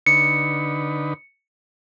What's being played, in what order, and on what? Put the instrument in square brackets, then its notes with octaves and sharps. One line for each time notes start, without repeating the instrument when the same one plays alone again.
[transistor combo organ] D3 D#4 B4 [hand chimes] C#7